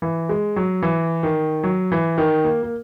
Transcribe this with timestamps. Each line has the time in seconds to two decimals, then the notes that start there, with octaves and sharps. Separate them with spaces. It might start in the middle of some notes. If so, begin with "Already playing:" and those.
0.02 E3
0.29 G#3
0.56 F#3
0.82 E3
1.23 D#3
1.63 F#3
1.92 E3
2.18 D#3
2.44 A#3
2.63 A#3